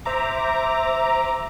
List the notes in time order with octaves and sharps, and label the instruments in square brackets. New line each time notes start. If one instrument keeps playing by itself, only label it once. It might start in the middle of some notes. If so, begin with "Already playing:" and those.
[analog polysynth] C5 E5 A#5 D6